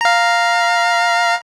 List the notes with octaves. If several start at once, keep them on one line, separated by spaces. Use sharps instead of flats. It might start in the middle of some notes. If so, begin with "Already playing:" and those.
F5 A#5